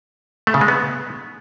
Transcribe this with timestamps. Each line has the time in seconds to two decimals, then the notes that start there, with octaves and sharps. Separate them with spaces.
0.47 A3
0.54 C#3
0.61 G#3
0.68 B3